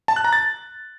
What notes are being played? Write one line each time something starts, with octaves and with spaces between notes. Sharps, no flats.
A5
F#6
A#5
A6